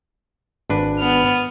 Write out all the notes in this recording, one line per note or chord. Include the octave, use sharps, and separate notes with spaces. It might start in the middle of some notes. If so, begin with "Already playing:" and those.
G#1 D4 B4
B3 F6